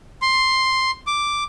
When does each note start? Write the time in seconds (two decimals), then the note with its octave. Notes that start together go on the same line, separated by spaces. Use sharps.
0.22 C6
1.07 D6